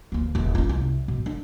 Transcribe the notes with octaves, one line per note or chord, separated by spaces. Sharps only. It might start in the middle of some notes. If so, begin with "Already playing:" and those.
D2 A#3
D#1 D#2
C#4 F4
C2
B2
D4